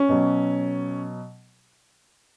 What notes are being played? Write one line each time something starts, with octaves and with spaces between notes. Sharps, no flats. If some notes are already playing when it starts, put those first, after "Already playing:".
Already playing: C#4
B2 F#3